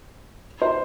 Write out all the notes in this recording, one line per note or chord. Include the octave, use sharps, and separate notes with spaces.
C5